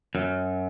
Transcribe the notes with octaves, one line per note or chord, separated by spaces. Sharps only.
F#2